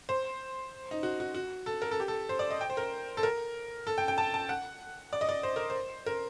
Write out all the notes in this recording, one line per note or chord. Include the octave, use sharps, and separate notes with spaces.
C5
D#4
F#4
F#4
F#4
A4
A#4
A4
G4
A4
C5
D5
D#5
G5
C5
A#4
A4
A#4
A4
G5
G5
A5
A5
F#5
D5
D#5
D5
C5
A#4
C5
A#4